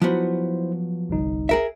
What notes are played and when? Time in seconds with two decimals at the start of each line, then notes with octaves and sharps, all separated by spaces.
0.02 F3 F#3 B3 E4 C5
1.09 G1 C2 D#4
1.49 G#4 A#4 E5